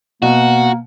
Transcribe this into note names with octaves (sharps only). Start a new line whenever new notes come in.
B2 A#3 F#4